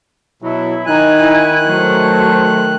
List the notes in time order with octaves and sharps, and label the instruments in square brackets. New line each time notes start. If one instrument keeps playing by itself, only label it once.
[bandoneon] B2 F#3 [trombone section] E4
[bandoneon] D#3 F#6 [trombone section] D#4 [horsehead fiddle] G#5
[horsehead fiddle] E4 G#5
[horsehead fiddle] F#3 C5 [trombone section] A3